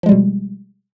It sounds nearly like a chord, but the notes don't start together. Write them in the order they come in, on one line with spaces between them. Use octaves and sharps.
F3 G#3 G3 B2